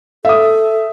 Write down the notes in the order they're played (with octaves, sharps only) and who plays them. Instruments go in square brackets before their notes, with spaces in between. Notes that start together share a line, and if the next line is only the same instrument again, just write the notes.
[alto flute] A4 [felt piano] E5 D#6